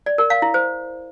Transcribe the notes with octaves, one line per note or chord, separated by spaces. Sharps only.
D5
A#4
F5
E4
C5